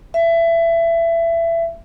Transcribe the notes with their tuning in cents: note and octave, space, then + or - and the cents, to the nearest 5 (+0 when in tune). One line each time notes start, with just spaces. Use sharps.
E5 +25